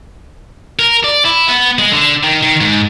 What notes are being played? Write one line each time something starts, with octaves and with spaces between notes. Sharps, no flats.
A#4
D5
E4
B3
G#3
D3
D#3
D#3
G#2